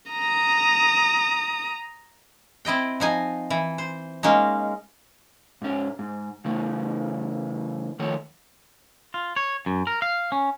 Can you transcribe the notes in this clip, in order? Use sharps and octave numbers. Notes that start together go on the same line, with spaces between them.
A#5 D#6
C4 E4 D#5 G5
F3 D#4 G#5
E3
C5
G#3 A#3 C#4 D#4
G#2 C#4
G#2
C#3 E3 A3
D#3 F3 A3 C#5
F4
C#5
F#2
A#4
F5
C#4